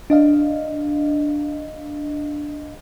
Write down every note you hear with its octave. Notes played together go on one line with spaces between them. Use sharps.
D4 D#5 F5